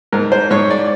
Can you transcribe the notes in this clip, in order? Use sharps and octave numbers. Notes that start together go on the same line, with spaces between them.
G#2 A#4
C5
G#2 C#5
D5